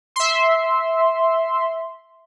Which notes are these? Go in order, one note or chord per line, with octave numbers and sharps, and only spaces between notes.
E5 C6